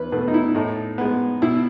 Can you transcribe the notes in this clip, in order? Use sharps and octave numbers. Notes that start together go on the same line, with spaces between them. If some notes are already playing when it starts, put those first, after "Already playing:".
Already playing: E2 B4
B2 A3 B4
D#4
E4
A2 D#4
G#3 B3
B2 E4